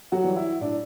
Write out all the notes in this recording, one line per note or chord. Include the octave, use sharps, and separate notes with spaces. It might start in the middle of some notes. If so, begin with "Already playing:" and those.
F#3 F#4
E3 G3
E4
A2 D4